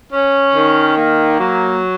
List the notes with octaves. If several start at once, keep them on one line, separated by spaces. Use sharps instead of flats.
C#4
D#3
A#3
F#3